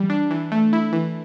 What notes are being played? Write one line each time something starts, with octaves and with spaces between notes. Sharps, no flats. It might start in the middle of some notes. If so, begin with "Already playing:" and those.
Already playing: E3 G3
D4
E3
A3
E4
E3